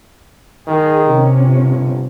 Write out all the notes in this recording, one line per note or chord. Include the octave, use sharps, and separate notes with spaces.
D#3 G#4
C3 C#4
G1